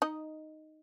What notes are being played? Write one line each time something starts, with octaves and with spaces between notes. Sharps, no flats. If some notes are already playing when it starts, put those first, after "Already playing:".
D#4 D#5